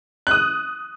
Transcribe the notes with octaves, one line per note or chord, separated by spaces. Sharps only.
D#6 F#6